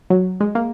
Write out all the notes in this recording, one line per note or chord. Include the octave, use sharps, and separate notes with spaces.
F#3
G#3
A#3